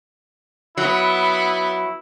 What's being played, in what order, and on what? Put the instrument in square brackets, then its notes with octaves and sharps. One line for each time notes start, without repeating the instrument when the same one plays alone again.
[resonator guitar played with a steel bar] F#3 [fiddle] B3 F#5 [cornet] E4